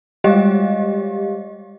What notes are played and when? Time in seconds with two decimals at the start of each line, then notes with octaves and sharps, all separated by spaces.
0.24 G3 G#3 G4 D#5 F5